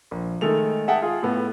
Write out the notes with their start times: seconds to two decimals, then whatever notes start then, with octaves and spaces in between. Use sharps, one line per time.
0.11 A#1
0.41 D#3 G#3 A3 A4 F7
0.87 G#4 E5 F#5 G5 A5
1.02 F4 G#4
1.23 A2 B3